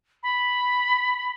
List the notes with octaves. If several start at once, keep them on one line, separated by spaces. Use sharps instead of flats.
B5